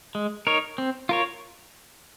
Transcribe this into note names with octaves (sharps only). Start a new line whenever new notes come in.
G#3
D#4 A#4 C#5
C4
F4 A#4 C#5